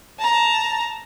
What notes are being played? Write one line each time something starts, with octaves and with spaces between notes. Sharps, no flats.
A5 A#5